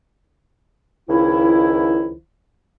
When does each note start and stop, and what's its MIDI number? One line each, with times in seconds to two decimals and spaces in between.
1.09 2.15 37
1.09 2.15 51
1.09 2.15 53
1.09 2.15 64